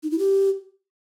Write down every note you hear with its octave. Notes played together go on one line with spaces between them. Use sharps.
D#4
E4
G4